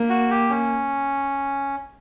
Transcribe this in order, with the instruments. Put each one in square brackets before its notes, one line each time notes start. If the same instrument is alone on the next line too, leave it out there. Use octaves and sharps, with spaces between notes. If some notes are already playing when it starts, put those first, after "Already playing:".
Already playing: [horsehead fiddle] A#3
[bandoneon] F#4
G4
C#4